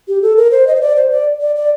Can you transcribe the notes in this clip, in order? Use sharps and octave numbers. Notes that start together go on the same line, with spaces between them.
G4
A4
A#4
C5
D#5
C5
D5
C5
D5
D5
D5